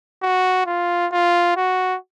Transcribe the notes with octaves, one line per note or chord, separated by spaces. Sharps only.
F#4
F4
F4
F#4